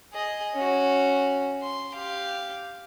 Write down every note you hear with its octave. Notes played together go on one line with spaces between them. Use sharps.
G#4 D#5
C#4 F#4
C6
G4 F5